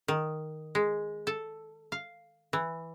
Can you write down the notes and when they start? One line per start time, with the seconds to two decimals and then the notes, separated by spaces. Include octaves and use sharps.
0.08 D#3
0.75 G#3
1.27 A4
1.92 F5
2.53 E3